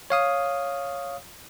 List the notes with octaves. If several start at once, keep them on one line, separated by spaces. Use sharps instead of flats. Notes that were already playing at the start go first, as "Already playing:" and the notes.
C#5 F5 D#6